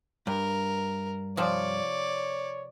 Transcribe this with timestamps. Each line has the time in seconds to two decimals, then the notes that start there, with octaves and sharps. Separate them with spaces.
0.27 G2 A#4
1.37 C3 F3 C#5 D5